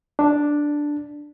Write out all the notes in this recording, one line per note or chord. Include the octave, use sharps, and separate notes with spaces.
D4